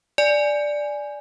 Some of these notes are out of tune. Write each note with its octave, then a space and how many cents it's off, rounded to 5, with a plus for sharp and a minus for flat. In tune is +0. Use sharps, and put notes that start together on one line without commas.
D5 +0 G#5 +0